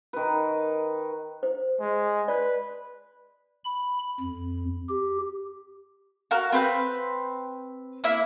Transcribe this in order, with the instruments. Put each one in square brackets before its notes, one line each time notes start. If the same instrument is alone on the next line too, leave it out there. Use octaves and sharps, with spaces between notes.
[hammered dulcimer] D#3 B4
[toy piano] C5
[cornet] G#3
[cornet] B4 [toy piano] D5
[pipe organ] B5
F2
G4
[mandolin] F#4 A#4 F5
C4 B4 G6
A#3 E4 E5